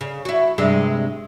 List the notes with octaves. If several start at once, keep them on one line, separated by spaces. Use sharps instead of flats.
C#3
E4 F#4
G2 C3 G#3